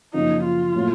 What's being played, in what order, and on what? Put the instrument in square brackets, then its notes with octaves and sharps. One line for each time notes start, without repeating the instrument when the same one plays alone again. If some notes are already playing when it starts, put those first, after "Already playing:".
[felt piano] F#2 C#3 F3 A#3 [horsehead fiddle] D#4
[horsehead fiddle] F4
[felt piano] A2 F#3 A#3